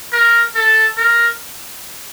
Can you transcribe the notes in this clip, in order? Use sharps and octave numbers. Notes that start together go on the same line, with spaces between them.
A#4
A4
A#4